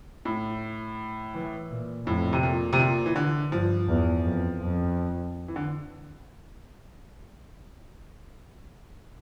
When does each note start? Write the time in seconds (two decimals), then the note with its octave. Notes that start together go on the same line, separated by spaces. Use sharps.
0.25 A2
1.34 E3
1.71 A#2
2.06 F2 A2
2.33 C3
2.43 A#2
2.73 C3
2.79 A#2
3.06 E3
3.16 D3
3.52 G2 F3
3.88 E2
4.25 F2
4.61 F2
5.48 E3
5.56 D3